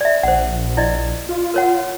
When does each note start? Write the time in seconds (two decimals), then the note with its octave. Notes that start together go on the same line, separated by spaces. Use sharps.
0.01 D5 E5
0.23 A#1 C5 F#5
0.77 E4 D5 D#5
1.29 F4
1.54 A#4 C#5 F#5